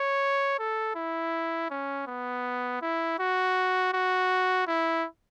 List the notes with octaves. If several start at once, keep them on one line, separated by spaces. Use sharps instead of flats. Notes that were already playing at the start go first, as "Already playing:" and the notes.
Already playing: C#5
A4
E4
C#4
B3
E4
F#4
F#4
E4